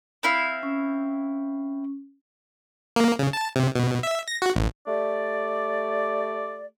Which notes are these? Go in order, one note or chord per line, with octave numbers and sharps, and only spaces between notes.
C4 E4 F5
C#4
A#3
C#3
A5
C3
B2
E5
A#6
F#4
A1
A3 G4 D5